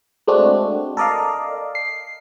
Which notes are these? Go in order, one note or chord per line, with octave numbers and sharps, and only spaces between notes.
G#3 A3 C4 D4 F#4
A4 A#4 D5 D#5 F5
C7